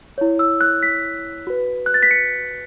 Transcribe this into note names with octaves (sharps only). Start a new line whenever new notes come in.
E4 C#5
E6
F#6
B6
F#4 B4
F#6
A6
B6
C#7